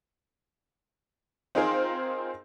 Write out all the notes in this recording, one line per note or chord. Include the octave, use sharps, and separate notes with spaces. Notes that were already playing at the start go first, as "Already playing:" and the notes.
C4 D#4 F4 G#4 A#4 C5